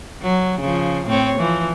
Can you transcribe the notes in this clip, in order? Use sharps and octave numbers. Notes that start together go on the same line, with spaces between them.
F#3
C#3 F3
A2 C4 C#5
E3 F3